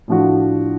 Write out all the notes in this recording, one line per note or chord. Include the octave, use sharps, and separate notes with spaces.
A2 F3 A3 D4 F#4